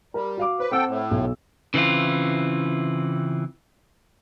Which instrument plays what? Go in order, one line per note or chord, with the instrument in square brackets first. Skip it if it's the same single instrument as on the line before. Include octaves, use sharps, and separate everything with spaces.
[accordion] G3 [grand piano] A#4
[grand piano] F#4 F5 D6
[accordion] B4 [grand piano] C5
[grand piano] C4 F#5 E6 [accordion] A4 G5
[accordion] A2
[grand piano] B1
[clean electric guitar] C#3 E3 C4 E4 F4